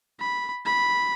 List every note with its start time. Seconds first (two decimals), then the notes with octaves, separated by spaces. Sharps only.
0.20 B5
0.66 B5